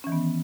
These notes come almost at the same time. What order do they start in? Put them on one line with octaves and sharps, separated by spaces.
C#4 E3 D#3 B3